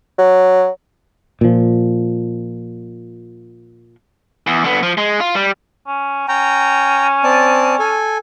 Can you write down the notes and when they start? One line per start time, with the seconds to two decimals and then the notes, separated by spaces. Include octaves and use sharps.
0.18 F#3
1.41 A#2 F3
4.47 E2
4.64 D3 B3
4.83 F3
4.98 G#3
5.20 F4
5.35 G3
5.87 C#4
6.28 C#4 G5 A#5
7.24 C4 D5 A5
7.79 A4 G#5